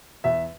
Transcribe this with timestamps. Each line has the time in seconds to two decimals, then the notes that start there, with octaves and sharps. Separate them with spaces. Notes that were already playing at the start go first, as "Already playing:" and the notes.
0.24 E2 E5